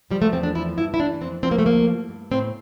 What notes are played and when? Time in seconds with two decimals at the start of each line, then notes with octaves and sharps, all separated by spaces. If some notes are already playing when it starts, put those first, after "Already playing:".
0.11 F3 G3
0.22 A3
0.32 E2 C4
0.43 D4
0.55 F3 E4
0.77 G2 E4
0.94 E4
0.99 E3 D4
1.21 F2 C4
1.43 F3 C4
1.51 A#3
1.58 A3
1.66 D2 A#3
1.88 G2
2.09 G2
2.32 A2 C4